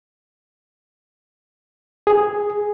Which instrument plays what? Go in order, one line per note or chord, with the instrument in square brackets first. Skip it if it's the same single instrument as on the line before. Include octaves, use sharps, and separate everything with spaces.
[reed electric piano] G#4